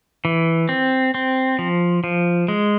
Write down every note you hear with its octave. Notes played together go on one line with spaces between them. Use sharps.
E3
C4
C4
F3
F3
G#3